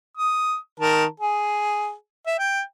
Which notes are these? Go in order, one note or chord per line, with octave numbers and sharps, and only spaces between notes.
D#6
D#3 A#4 A5
G#4
E5
G5